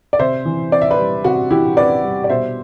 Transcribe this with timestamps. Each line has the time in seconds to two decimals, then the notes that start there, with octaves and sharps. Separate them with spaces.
0.13 D5
0.19 C3 C5 E5
0.45 E3
0.72 C4 D5
0.82 E5
0.90 B4 D5
0.98 G3
1.24 C3 F#4
1.50 E3 E4 G4
1.77 C4 B4 D5
2.03 G3
2.24 D5
2.29 B2 C5 E5